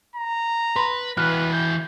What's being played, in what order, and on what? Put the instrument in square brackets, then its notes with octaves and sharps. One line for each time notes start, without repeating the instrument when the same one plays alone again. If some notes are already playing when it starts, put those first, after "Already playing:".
[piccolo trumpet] A#5
[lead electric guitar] B4 [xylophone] B5 C6
[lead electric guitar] E3 F#4 [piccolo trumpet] B4 [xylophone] F6 F#6
[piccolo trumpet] G6